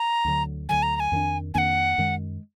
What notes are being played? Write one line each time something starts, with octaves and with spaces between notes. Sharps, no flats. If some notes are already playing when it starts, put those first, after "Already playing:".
Already playing: A#5
D2 D3 F#3
D2 D3 F#3 G#5
A#5
A#5
G#5
F2 D#3 A#3 D4
F2 D#3 A#3 D4 F#5 G#5
F#2 D#3 G#3